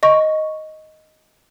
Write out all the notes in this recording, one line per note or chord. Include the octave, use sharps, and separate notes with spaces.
D#5 C#6